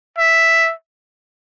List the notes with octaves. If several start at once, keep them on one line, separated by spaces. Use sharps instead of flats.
E5